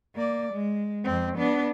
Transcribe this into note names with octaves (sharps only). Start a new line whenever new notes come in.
A#3 D5
G#3
F2 C4
B3 D4